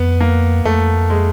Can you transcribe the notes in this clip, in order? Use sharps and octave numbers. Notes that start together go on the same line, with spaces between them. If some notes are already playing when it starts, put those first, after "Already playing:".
Already playing: F2 B3
A#3
F2 A3
G#3